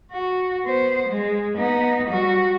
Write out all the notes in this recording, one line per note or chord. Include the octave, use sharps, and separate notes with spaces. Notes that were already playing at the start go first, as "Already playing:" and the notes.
F#4
B3 C5
G#3
B3 D#4
G3 F#4